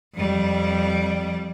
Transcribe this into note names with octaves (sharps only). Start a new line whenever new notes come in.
F2 G3